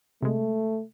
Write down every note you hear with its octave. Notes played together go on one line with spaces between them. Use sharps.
C3 G#3 A3